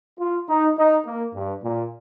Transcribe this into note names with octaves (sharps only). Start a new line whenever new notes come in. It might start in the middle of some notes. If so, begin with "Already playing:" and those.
F4
D#4
D#4
A#3
G2
A#2